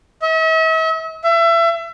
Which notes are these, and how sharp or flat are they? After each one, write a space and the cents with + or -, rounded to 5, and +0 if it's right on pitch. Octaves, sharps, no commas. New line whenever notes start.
E5 -45
E5 +30